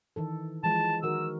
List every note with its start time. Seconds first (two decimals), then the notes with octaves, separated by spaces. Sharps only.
0.16 D#3 E3 A4
0.64 E3 F3 G#3 A5
1.03 D#3 F#4 A#4 E6